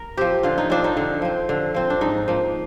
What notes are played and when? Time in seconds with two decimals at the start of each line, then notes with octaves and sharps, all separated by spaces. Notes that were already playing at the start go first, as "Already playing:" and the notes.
Already playing: A#4
0.17 F3 C4 G4
0.43 D3 F4
0.58 D#4
0.70 F3 C4 D4
0.84 D#4
0.97 D3
1.22 F3 C4
1.49 D3
1.74 F3 C4
1.90 D4
2.01 G#2 D#4
2.28 F3 A#3